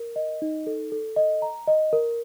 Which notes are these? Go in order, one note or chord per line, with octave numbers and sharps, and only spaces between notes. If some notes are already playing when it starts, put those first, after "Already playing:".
Already playing: A#4
D#5
D#4
A4
A4
D#5
A#5
D#5
A#4